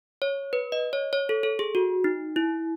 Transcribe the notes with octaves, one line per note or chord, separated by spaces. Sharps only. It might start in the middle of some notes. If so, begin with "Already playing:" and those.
C#5
B4
D#5
C#5
C#5
A4
A4
G#4
F#4
D#4
E4